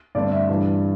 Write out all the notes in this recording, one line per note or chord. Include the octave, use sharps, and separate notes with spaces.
G2 D3 A3 C4 D5
E5
G2 E3 G3 D4